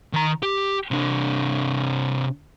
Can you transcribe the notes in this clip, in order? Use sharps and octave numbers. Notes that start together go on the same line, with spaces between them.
D#3 A#5
G4
C3 D4